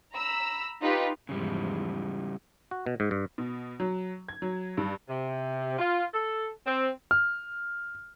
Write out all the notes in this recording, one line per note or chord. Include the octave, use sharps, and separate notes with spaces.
A#5 B5 E6
D#4 F4 G4 B4
E2 G#2 C#3 F3 G3
F#4
B2
G#2
G2
B2
F#3
G#6
F#3
G2
C3
F4
A4
C4
F6